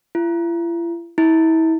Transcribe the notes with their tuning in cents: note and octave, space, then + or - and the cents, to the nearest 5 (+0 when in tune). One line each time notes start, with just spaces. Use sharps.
E4 +45
E4 -35